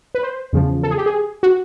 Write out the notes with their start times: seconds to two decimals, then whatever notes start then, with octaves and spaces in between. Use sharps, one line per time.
0.15 B4
0.23 C5
0.53 E2 C#3 F3
0.83 A4
0.91 G#4
0.98 G4
1.06 G#4
1.43 F#4